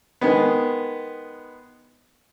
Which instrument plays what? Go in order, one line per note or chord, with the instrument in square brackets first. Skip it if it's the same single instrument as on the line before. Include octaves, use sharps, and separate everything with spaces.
[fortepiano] D#3 G#3 B3